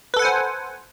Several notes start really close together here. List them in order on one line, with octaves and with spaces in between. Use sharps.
B4 A4 F#5 G#5 C5